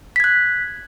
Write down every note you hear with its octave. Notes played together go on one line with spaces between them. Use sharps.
F#6 G#6 B6